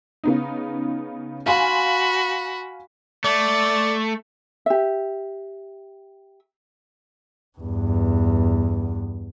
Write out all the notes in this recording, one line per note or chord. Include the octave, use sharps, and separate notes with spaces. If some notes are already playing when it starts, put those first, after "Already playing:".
C#3 B3 D#4
F#4 F5 G#5 B5 C6
A3 D5
G4 E5
E2 G2